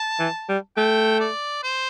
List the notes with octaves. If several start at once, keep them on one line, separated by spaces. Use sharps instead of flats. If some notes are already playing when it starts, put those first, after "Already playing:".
Already playing: A5
E3
G3
A3 G5
D5
C5